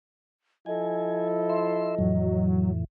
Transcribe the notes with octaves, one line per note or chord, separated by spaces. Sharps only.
F3 E4 A4 D#5 G#5
E5 C6
F2 A2 E3 F#3